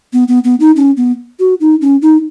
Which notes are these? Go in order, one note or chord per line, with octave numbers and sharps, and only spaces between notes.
B3
B3
B3
D#4
C#4
B3
F#4
D#4
C#4
D#4